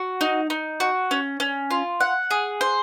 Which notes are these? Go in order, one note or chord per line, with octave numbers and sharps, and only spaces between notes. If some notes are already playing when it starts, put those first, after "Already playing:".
Already playing: F#4
D#4
D#4
F#4
C#4
C#4
F4
F#5
G#4
C5